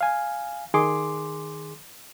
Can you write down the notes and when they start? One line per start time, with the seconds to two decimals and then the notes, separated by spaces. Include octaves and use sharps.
0.01 F5 G#5
0.74 D#3 G#4 C6 D6